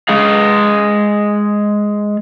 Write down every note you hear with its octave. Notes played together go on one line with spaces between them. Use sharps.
G#3 G#4 F5